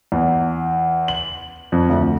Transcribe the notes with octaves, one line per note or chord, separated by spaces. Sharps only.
E2
F#7
F2
D2